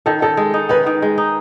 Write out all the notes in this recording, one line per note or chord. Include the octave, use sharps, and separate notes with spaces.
D#3 A4
D#3 A4
G#3
D#4
D#3 B4
D#3
G#3
D#4